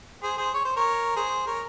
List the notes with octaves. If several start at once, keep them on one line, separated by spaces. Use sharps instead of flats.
G#4 C5
G#4 C5
C#5
C5
A#4 C#5
G#4 C5
A#4 C#5